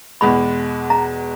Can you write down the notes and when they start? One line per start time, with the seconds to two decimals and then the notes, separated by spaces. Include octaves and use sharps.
0.21 E2 B2 G#3 B5
0.90 A#5